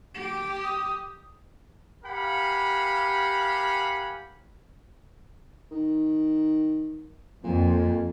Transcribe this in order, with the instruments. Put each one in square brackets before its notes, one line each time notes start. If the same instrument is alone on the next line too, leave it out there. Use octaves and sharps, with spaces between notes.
[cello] G4
[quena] D#6
[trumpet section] G4 A#4 F5 F#5 G#5 B5
[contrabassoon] D#3
[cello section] F2 [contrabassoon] A#2